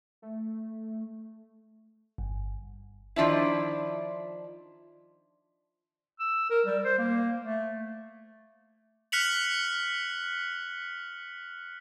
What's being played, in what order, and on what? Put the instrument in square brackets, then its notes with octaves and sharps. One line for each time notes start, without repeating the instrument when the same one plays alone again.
[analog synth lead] A3
[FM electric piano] G1
[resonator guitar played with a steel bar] D#3 F3 D4 E4
[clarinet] E6
A#4
G3
C5
A#3
A3
[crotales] F6 F#6 B6 C#7 F7 F#7